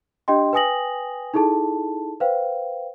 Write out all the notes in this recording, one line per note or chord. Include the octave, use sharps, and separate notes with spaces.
D4 G4 D#5 G5 C6
B4 G5 G#5 D#6 A#6 F#7
D#4 E4 G#4 A4 A5
B4 C5 F5 G5